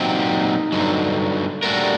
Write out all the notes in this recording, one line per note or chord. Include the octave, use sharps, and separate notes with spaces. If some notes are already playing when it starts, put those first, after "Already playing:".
Already playing: A#2 F#3 C4 D#4 G4
G2 D3 F#3
A#2 G3 A3 D4 F#4 A#4